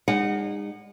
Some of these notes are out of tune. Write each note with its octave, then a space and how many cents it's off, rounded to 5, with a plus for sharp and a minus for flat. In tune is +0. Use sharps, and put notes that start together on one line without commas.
G#3 -40 D#4 -25 F#5 +0